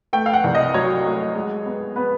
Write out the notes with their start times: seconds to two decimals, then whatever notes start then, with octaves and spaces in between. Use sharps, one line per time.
0.13 A3 G5
0.26 F5
0.33 F#5
0.44 C2
0.55 D#5
0.74 F#3 C#5
1.05 A3
1.35 G#3
1.66 B3
1.96 B3 B4